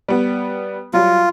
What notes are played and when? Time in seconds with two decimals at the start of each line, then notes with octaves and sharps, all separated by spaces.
0.08 G3 B3
0.93 F#3 G3 F4